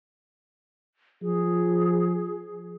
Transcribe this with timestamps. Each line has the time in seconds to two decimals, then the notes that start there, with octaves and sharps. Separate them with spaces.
1.22 F3 G#4